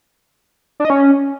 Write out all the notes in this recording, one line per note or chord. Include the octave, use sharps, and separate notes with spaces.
D4
D#5
C#4